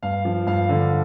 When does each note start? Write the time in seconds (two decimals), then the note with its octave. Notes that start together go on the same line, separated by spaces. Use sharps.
0.03 G2 F5
0.25 F3
0.46 G2 F5
0.69 D3